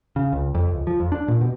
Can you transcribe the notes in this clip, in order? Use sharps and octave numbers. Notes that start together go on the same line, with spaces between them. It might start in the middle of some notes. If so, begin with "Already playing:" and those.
C#3
C#2
F2
C#2
F3
F2
D4
A#2
B2